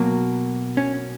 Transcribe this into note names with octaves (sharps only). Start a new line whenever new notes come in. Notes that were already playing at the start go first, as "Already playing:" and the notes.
Already playing: B2 F#3 A#3
C#4